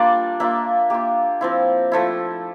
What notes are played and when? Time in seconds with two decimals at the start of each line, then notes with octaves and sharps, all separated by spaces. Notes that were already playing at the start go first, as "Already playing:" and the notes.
Already playing: G3 A#3 D4 F4 D5
0.40 A#3 D4 F4 E5
0.90 A#3 F4 G4
1.41 F3 C4 E4
1.92 F3 A3 E4